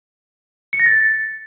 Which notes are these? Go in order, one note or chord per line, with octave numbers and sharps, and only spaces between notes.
C#7
A#6
A6